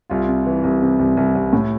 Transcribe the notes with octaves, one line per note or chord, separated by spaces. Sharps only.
C2 F4
C3
E3
C2
C3
C2
C2
C2
A2